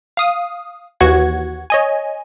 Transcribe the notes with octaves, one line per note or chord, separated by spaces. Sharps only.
F5 D#6
D#2 E3 F#4 F#5 G#6
C#5 D#5 G#5